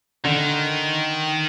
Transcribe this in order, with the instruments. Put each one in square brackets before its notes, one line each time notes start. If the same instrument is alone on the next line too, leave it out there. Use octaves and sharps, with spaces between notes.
[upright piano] D3 [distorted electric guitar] D#3